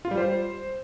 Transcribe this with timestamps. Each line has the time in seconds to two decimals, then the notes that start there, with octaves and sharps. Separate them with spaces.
0.05 F4
0.11 G3
0.17 C5